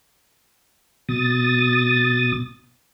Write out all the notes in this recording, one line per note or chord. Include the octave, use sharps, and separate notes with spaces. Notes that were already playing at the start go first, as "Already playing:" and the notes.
B2 D#6 A6